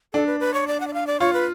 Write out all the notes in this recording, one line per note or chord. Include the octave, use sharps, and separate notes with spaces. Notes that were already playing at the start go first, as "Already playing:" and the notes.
D4 A4
B4
B4
C#5
D5
F#5
D5
F5
D5
F4 C#5
B4